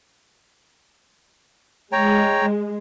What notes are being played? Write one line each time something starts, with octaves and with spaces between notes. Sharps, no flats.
G#3 C#5 G5 A#5